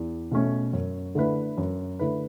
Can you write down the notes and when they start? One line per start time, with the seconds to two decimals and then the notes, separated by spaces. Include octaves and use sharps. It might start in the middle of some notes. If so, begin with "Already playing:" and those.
Already playing: E2
0.31 B2 A3 C#4
0.73 F#2
1.15 D3 A3 E4 B4
1.58 F#2
1.99 D3 A3 E4 B4